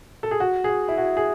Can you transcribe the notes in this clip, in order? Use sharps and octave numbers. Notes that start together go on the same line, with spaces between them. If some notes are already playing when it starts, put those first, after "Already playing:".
A4
G#4
F#4
G#4
F#4
E4
F#4
G#4